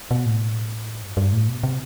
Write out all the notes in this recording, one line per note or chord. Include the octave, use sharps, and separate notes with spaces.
B2
A2
G2
G2
A2
B2
C3